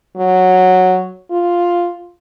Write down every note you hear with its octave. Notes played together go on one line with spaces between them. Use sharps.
F#3
F4